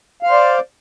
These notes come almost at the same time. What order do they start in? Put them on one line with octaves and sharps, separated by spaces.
F5 C5 D5